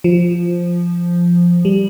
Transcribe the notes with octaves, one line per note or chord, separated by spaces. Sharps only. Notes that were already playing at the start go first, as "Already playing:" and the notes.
F3
G3